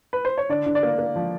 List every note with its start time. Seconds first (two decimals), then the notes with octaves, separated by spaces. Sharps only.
0.13 B4
0.25 C5
0.38 C#5
0.49 D3 D5
0.66 D3
0.75 D5
0.83 A#3
0.99 A#3
1.16 F3